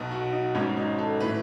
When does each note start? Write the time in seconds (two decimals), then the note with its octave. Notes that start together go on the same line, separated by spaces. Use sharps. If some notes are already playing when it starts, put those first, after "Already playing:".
Already playing: B1 B2 F#3
0.11 F#4
0.33 D#4
0.55 G#1 G#2 F#3 C#4
0.77 D#4
0.98 A4
1.20 A2 E3 B4